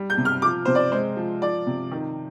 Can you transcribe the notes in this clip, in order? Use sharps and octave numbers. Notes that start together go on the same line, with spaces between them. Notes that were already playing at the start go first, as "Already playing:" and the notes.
Already playing: G3
G6
C3
F6
F3 D6
C3 C5
D5
G#3 C5
F3
F3 D5
C3
D#3